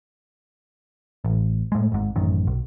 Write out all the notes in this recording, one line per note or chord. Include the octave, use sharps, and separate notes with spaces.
A1
A2 G#3
G#1 G#2
A1 F#2 D#3
B1